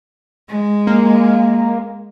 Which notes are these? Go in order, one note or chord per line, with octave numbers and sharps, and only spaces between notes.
G#3
A#3